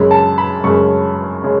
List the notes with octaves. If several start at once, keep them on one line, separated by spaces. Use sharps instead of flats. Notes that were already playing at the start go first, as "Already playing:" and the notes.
Already playing: F#2 C#3 G#3 B5
A5
B5
F#2 C#3 G#3 C#6
C#3 G#3